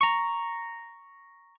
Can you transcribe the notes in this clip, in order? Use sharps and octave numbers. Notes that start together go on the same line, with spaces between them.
A#5 C#6